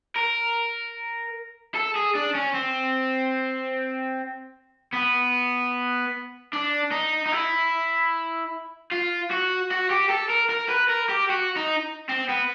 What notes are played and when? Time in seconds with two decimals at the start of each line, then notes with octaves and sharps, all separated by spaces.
0.16 A#4
1.75 A4
1.95 G#4
2.15 D4
2.35 C#4
2.55 C4
4.93 B3
6.53 D4
6.92 D#4
7.26 D#4
7.32 E4
8.92 F4
9.31 F#4
9.71 F#4
9.90 G4
10.10 A4
10.30 A#4
10.50 A#4
10.70 B4
10.90 A#4
11.09 G4
11.30 F#4
11.57 D#4
12.09 C4
12.29 B3